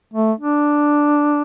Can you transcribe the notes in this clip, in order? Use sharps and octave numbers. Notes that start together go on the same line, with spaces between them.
A3
D4